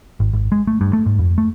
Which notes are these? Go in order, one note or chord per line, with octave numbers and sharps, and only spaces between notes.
G#1
G#1
G#3
A3
G2
A3
G#2
F2
A3